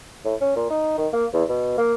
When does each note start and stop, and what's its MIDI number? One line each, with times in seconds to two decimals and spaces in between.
0.25 0.35 45
0.41 0.53 61
0.56 0.67 46
0.70 0.95 63
0.98 1.08 51
1.13 1.26 58
1.33 1.44 40
1.49 1.75 47
1.77 1.95 58